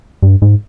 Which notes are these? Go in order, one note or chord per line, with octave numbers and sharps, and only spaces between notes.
G2
G#2